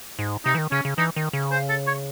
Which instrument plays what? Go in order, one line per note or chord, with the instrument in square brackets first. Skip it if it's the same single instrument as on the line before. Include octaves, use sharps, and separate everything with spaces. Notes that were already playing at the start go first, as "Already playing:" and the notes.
[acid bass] G#2
[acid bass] C3 [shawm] D#4
[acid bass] E3
D#3
[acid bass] C#3 [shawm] C#4
[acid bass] C#3
[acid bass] E3 [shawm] D#4
[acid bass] D#3
C#3
[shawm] C5
A4
C#5